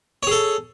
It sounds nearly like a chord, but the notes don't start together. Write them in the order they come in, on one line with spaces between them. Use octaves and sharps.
C#5 G#4 A4